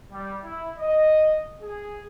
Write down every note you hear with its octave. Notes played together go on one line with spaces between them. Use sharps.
G3
E4
D#5
G#4